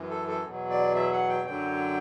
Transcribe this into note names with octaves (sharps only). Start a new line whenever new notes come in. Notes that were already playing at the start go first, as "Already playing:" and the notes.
Already playing: F#2 E3
A4
A4
E2 B2 F#3
D5
E5
F#5
G5
F#2 D3 F#3 G5